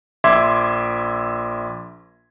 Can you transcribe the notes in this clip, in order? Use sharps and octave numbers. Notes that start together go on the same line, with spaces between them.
A#1 E5 C6 D6 G#6